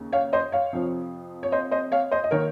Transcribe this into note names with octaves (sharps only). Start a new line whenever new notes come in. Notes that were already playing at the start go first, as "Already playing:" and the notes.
Already playing: D#2 C#3
C#5 F5
C5 D#5
C#5 F5
F2 C3 F3
C#5
C5 D#5
C5 D#5
C#5 F5
C5 D#5
D#5
D#3 A#3 A#4 C#5